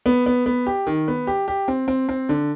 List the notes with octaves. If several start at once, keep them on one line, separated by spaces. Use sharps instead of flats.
B3
B3
B3
G4
D#3
B3
G4
G4
C4
C4
C4
D3